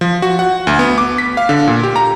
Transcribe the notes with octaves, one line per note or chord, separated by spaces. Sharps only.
F3
F#4
F#5
D2
B3
D6
B6
F5
D3
A#2
G4
A#5